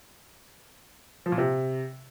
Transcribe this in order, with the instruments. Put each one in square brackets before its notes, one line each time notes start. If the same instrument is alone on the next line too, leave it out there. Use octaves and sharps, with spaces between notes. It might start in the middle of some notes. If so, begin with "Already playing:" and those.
[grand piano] F3
A#2
C3